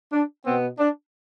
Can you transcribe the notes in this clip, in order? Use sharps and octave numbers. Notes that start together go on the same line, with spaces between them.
D4
B2 B3 C4
D4